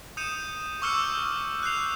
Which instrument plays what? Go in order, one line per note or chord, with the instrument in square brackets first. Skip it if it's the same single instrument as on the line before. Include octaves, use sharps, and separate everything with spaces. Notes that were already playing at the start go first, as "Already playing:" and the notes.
[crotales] D#6 G6 C#7 D#7 E7
C#6 D6 E6 F6 G6 C#7
F#6 G6 C7 F7